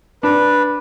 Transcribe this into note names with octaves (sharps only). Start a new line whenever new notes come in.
D4 B4